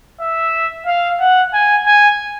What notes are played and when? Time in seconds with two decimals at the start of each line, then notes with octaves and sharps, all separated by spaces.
0.21 E5
0.86 F5
1.20 F#5
1.54 G#5
1.86 G#5